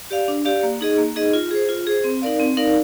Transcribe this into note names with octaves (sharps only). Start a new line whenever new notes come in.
G4 D5 F5
D4
G4 D5 F5
A#3
D#4 G#4 D#5
A#3
D#4 G#4 D#5
F4
G#4 C5
F4
G#4 C5
C4
D#4 A#4 D5 F5
C4
D#4 A#4 D5 F5